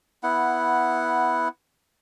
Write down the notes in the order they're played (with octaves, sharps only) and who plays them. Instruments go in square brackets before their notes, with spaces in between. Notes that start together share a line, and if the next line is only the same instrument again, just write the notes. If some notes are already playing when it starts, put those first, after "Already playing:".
[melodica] B3 E4 F#5